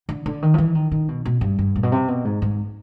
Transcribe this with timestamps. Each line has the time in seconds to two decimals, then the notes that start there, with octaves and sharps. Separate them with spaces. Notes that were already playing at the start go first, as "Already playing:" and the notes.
0.09 D3
0.26 D3
0.42 D#3
0.54 F3
0.58 E3
0.75 D#3
0.92 D#3
1.08 B2
1.25 B2
1.41 G2
1.59 G2
1.76 A#2
1.83 B2
1.92 C3
2.08 B2
2.25 G#2
2.42 G#2